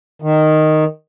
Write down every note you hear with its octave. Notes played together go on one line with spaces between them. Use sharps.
D#3